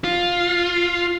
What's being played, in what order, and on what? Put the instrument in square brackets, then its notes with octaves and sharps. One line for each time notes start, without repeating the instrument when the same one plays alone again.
[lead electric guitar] F4